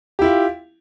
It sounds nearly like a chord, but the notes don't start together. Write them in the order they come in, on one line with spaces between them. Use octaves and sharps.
G4 E4 F4